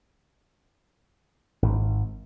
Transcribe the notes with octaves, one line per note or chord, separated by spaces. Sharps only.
G#1